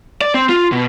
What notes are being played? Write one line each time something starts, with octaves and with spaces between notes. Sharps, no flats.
D5
C4
F4
B2